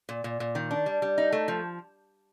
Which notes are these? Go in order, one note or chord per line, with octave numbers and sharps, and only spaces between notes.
A#2
A#2
A#2
D#3
D4
G3
G3
D#4
A3
F3